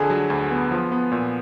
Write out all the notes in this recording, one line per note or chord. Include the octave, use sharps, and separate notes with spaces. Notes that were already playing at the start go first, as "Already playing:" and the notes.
Already playing: F2 D3 G#4 G#5
F#3
D2
B3
F3
B3
A#2